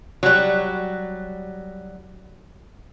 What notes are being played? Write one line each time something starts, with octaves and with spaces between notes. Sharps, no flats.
F#3 G3